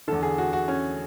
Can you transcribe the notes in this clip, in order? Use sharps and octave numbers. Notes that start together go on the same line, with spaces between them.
E2 D3 A4
G#4
F#4
F#4
C#4